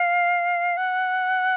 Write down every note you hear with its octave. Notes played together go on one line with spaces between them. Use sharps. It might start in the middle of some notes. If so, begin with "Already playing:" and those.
Already playing: F5
F#5